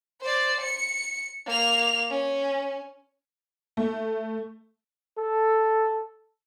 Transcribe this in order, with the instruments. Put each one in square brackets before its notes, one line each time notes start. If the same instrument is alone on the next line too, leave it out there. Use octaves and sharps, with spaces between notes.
[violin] C5 D5
C#7
A#3 F7
C#4
[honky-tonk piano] A3
[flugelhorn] A4